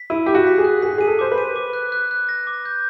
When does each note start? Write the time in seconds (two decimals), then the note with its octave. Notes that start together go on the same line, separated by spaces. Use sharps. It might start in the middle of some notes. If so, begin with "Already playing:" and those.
Already playing: B6
0.10 E4 D#7
0.26 G4 D6
0.34 F#4
0.47 B6
0.58 G#4
0.65 F#6
0.82 G#4 B6
0.90 G4
0.98 G#4 D#7
1.07 A4
1.19 C5 D6
1.32 B4
1.38 D#7
1.56 D6
1.73 F#6
1.92 F#6
2.11 F#6
2.29 A#6
2.47 D6
2.65 G6